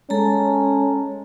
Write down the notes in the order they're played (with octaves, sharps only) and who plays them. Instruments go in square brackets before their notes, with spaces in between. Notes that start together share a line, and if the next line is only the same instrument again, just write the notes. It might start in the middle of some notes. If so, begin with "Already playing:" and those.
[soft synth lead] G#3 [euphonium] C#4 [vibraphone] A4 A5 A#5